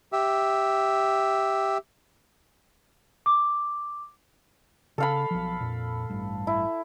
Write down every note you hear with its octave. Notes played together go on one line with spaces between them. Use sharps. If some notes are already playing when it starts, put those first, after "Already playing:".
G4 E5
D6
C#3 A4 F5 B5
B1 F3
F2 A#2
A1 G2
E4